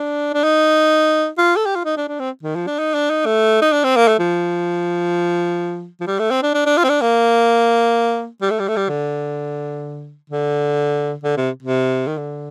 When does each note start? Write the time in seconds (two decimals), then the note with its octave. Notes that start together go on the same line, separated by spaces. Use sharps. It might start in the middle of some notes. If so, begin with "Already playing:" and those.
Already playing: D4
0.34 D4
0.44 D#4
1.38 F4
1.56 A4
1.66 G4
1.75 F4
1.85 D#4
1.97 D4
2.08 D4
2.20 C4
2.43 D#3
2.56 F3
2.67 D4
2.79 D#4
2.94 D4
3.10 D#4
3.26 A3
3.62 D#4
3.73 D4
3.84 C4
3.96 A#3
4.08 A3
4.19 F3
6.01 F3
6.07 G3
6.19 A3
6.31 C4
6.43 D4
6.54 D4
6.66 D4
6.77 F4
6.84 C4
6.89 D4
7.02 A#3
8.42 G3
8.51 A3
8.59 G3
8.68 A3
8.77 G3
8.89 D3
10.30 D3
11.24 D3
11.37 C3
11.63 C3
12.07 D#3
12.18 D3